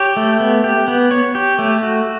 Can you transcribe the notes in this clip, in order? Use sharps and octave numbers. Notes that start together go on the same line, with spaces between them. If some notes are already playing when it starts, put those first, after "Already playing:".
Already playing: G4 C#5
A3
B3
G4
B3
C#5
G4
A3
F#4